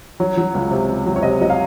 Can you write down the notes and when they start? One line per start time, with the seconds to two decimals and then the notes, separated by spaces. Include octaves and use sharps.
0.20 F#3 C#5
0.37 F#3
0.55 C#2
0.71 C3
0.89 C#2
1.06 F#3
1.16 C#5
1.23 C3 D#5
1.41 F#3 D#5
1.50 F5